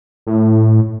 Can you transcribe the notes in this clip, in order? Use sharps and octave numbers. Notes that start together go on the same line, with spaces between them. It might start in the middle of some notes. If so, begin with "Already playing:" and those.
A2